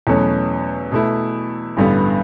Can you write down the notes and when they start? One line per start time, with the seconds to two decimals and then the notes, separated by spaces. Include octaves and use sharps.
0.07 E2 B2 F#3 A3 C#4
0.92 B2 A3 E4
1.77 A1 G2 D3 G3 B3